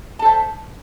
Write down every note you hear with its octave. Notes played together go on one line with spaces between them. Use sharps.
A4 C5 E5 A5